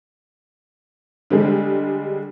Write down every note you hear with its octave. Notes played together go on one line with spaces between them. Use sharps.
D3 G3 G#3